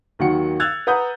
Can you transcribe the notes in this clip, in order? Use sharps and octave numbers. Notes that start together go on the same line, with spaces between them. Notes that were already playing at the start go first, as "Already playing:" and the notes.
D#2 D#3 F#3 F#5 C#7
E6 F#6 G#6 A6 F7
B4 F#5 A#5 D#6 G6